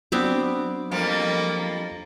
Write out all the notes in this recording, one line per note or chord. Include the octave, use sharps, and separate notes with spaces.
F#3 B3 C4 D4 D6
F2 F3 G3 A#3